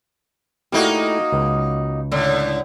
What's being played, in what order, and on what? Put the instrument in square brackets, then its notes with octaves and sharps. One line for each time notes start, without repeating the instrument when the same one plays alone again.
[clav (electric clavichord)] A3 E4 G4 [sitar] A#3 D#4 F#4
[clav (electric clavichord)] C#2
[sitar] A2 D3